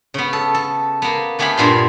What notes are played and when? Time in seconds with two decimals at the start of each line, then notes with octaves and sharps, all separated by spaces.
0.14 C#3 B3
0.33 A4
0.54 A4
1.02 A#3 B3
1.39 A3 B3 G4 G#4 F5 B5
1.57 G2 A#2 B3 C6